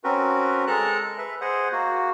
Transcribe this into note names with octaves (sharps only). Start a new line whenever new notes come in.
C4 C#4 F#4 A#4 B4
G#3 A4 A#4 A5 A#5 F#6
B4 E5
G#4 C5 D#5 F#5
A#3 F#4